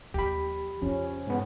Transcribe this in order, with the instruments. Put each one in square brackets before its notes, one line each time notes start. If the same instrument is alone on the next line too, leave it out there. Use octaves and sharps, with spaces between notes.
[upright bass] D#2 F3 [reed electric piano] G4 B5
[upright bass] F2 [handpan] F3 C#4
[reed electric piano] G#2 B3